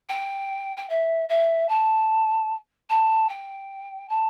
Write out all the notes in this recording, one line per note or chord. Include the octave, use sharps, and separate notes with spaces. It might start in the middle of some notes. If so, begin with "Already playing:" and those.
G5
G5
E5
E5
A5
A5
G5
A5